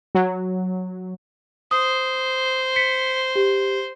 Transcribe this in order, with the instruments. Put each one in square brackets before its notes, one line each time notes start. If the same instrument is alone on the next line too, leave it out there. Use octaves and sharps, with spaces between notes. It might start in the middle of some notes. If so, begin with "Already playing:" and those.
[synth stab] F#3
[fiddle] C5 [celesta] D#6
[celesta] B6 C#7
G4